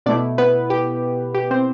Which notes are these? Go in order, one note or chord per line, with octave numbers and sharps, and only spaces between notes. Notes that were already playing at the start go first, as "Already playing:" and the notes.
B2 A3 D4 E4 D5
B3 B4
G4
G4
C4 C5